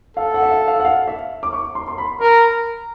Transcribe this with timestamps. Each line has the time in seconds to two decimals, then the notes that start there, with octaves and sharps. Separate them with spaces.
0.17 A4 F5
0.34 F#5
0.43 E5
0.51 F5
0.68 F5
0.80 F#5
0.85 F5
1.08 E5
1.43 D6
1.53 C#6
1.75 C6
1.88 C6
1.98 B5
2.21 A#4 B5